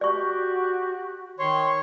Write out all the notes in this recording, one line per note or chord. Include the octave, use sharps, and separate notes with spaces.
F#4 G4 D5 C#6
D#3 C#5 C6